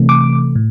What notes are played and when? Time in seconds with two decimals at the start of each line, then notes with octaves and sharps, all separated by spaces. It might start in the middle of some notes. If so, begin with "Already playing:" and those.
Already playing: C3 E3 A3
0.09 D6
0.55 A2